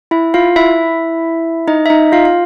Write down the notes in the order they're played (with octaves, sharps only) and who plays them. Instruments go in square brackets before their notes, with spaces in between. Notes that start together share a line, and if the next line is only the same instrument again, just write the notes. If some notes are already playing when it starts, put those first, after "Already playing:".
[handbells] E4 E5
F4 F5
E4 E5
D#4 D#5
E5
D#4 D#5
F4 F5
F5